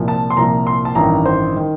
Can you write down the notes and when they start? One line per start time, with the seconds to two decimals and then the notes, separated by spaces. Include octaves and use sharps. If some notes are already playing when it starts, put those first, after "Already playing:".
Already playing: C2 A#2 F3
0.08 A5
0.30 C6
0.37 C2 A#2 F3 A#5
0.67 C6
0.85 A5
0.95 A1 G2 D#3 A#5
1.26 C5
1.56 D#3